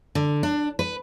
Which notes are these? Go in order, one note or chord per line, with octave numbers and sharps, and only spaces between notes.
D3
D4
B4